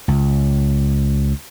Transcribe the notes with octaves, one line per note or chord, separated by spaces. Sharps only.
C#2